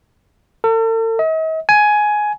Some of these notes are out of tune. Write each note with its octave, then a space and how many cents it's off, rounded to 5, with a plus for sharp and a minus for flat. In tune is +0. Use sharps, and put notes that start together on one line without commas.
A4 +45
D#5 +45
G#5 +15